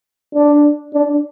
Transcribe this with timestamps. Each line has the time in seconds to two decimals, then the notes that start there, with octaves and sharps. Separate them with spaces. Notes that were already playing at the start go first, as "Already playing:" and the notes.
0.35 D4
0.94 D4